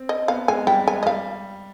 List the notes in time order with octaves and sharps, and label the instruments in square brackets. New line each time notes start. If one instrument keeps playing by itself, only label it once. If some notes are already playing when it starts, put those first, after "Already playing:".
Already playing: [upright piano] C4
[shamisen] D#5
[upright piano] B3 [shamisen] F5
[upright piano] G#3 [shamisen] G#5
[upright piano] G3 [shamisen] G5
[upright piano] G#3 [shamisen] G#5
[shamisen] D#5
[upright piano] G3 [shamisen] F5